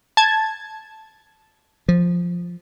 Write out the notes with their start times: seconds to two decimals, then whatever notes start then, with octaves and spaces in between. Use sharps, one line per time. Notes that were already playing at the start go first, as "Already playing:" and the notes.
0.17 A5 G#6
1.89 F3